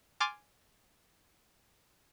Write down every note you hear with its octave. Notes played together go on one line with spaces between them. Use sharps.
G#5 C6 D6 F6 A6